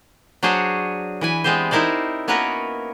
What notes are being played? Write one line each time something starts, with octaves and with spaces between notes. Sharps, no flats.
F#3 D4 F#4 G#4 C5 C#5
E3 B4 G#5
G#3 B3 C4 G4 C5
D#4 E4 A#4 C5 D5
A#3 B3 C#4 F#4 A#4 B4